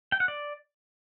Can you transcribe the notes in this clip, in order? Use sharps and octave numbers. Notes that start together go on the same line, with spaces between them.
G5
F#5
D5